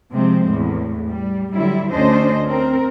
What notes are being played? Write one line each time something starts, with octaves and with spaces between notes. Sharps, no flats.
C3 F3 G#3 C4
E2 A2
G3
D3 F#3 G3 E4
D2 D3 C#4 D4 C5 D#5
C4 A#4